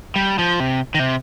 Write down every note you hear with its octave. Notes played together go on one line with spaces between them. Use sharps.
G3
F3
C3
D#3
C3